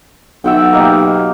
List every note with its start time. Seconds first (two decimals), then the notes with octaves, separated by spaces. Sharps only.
0.44 B1 E5 F#5 G5
0.73 A#3 D#4 G4